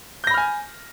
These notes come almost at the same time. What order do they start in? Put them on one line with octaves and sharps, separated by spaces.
G6 A#6 B5 F6 G#5